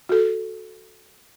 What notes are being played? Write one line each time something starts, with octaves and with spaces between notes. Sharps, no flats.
F#4 A4